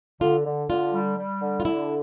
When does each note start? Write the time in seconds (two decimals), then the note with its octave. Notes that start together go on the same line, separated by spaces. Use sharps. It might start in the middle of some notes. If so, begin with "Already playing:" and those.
0.21 D3 F4
0.45 D3
0.69 D3 F4
0.93 G3
1.17 G3
1.41 D3
1.60 F4
1.65 D3 E4